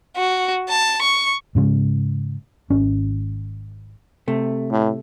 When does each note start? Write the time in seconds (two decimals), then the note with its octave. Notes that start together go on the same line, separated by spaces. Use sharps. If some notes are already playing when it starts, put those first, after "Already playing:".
0.17 F#4
0.69 A5
1.02 C#6
1.55 G#2 C#3 G#3
2.70 G#1 C#4
4.28 C3 A3
4.71 A2